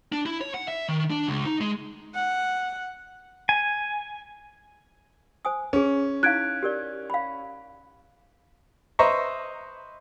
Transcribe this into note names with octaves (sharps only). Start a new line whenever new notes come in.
D4
E4
C#5
F#5
E5
D#3
D4
C#2
D#4
G#3
F#5
G#5
C5 G#5 D#6
C#4 G#4 C#5
D#4 E4 F5 F#6 G#6 D7
G4 A#4 D5
F5 B5
B4 C5 D#5 E5 A#5 C#6